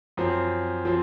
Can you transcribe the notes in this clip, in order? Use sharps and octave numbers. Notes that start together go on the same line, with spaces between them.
F#2 F3 C4
F3 C4